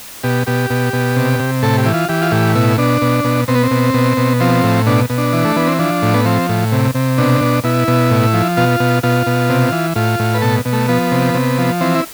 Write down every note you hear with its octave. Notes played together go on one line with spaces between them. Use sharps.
B2 G4
B2 G4
B2
B2
C3
C3
A2 A4
G4
E3
F4
E3 G4
F4
A2 G4
B2 E4
B2 D4
B2
B2
B2 C4
B3
C4
B2
B2
B2
F3 C4
A2
B2 D4
B2
D4
E3
A3
E3 B3
C4
F3 D4
A2
B3
F3 C4
A2
C3
C3
B2 D4
B2
B2 E4
B2
A2
F3
B2 F4
B2
B2 F4
B2
C3
E3
A2 F4
A2
B4
B2 A4
B2
A3
F3 B3
C3
C3
F3
E3 C4
E4